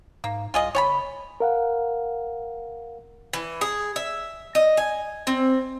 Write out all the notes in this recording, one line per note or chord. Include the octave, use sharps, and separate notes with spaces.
G#2 A#3
C2 F4 G#4 D#5
F#1 C#5 G#5 B5
A#4 F5 F#5
E3
G#4
E5
D#5
G#5
C4